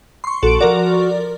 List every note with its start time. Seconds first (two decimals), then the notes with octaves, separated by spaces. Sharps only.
0.24 C6 C#6
0.43 A#1 F#4 A4 D7
0.61 F3 F#4 A#4 D5